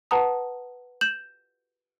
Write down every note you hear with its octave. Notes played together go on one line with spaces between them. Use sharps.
B4 F#5 A5 A#5 D#6
G6 E7 F#7